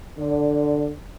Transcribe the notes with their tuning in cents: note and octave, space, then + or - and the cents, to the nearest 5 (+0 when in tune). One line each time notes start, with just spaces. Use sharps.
D3 +10 D5 -15